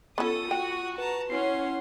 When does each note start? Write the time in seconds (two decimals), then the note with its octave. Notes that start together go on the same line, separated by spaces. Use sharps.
0.18 B3 C#4 F4 A4 C#6 D#6
0.51 F#4 G5
0.98 B4 A5 A#5
1.30 C#4 E4 F#5 G#5 C6 C7